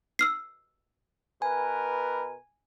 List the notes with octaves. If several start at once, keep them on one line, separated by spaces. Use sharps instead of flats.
E6 F6 C7
B2 A#4 B4 G#5